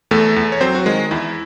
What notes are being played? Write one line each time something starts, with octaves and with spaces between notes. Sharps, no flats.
E2 A3 A4
E2
C#5
F#3 C4 C5
F#4
D#3 G#3 G#4
E2 E4